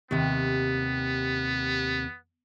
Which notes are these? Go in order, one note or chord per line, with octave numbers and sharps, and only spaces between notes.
D#2 C3 B3